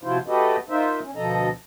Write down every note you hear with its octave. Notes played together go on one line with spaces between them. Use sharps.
C3 F3 F#3 E4 F4 C5
A3 F#4 G4 A4 B4 D#5
D#4 F4 A#4 C5 E5
C#4
D2 B2 F3 A4 D#5 A#5